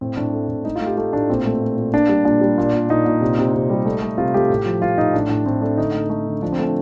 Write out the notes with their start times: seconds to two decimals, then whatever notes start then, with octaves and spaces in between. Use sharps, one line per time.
0.01 A2 C4
0.17 A2 D4
0.33 A3
0.49 A2
0.64 A3 D#4
0.76 F4
0.80 A3
0.86 G4
0.97 A3 F4
1.13 A2 D4
1.29 A#2 C4
1.46 A3
1.62 A#2
1.77 A#2
1.94 A#3 D4
2.09 G3
2.25 A#2 D4
2.41 G3
2.58 A#2
2.74 A#2
2.90 A#2 D#4
3.05 A#2
3.21 C3
3.38 C3
3.54 C3
3.70 G3
3.85 A3
4.02 A3
4.18 C3 F4
4.34 A3 G4
4.50 A2
4.66 F3
4.81 F3 F4
4.97 A2 D#4
5.13 A2 D4
5.29 A2 D4
5.46 A2 C4
5.61 A3 D4
5.77 D3 D#4
5.94 A3
6.10 A3
6.27 D3
6.42 F3 D4
6.53 C4
6.59 A3 D4